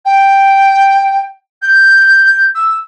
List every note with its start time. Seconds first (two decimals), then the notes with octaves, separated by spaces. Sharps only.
0.05 G5
1.61 G6
2.55 E6